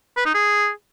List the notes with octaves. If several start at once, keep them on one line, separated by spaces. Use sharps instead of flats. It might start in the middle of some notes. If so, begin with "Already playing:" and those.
B4
D#4
G#4